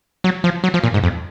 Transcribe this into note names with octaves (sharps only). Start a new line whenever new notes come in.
F#3
F3
F#3
F3
A#2
G#2
F2